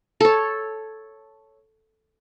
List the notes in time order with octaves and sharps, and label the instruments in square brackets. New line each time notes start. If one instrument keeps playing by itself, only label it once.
[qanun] A4 C#5